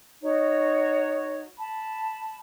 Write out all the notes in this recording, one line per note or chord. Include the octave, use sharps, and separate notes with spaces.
D#4 F#4 C#5
A5 B5